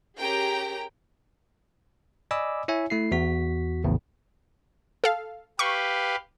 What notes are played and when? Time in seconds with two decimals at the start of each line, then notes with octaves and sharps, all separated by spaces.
0.20 C#4 G4 G#4 A#4 G5 A#5
2.31 D5 D#5 G#5 B5 D6 E6
2.68 E4 C#5 E5 G#5
2.90 A3 E4 C7
3.11 E2 F#4 B6
3.84 A#1 E2 A2 C#3
5.04 A4 F5
5.59 G4 B4 F5 C#6